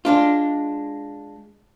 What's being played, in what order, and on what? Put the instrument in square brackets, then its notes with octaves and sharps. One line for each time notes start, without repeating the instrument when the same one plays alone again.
[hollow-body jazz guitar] G#3 D4 F4